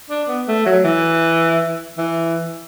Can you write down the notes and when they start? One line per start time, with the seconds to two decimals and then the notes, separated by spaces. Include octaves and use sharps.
0.10 D4
0.29 B3
0.48 A3
0.66 F#3
0.84 E3
1.98 E3